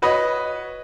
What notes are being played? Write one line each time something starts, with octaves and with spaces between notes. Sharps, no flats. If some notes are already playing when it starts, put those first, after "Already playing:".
F#4 B4 C#5 D#5